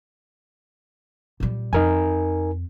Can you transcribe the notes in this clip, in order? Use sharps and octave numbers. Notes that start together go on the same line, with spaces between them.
A#2 G3
F2 D#4 A#4 G#5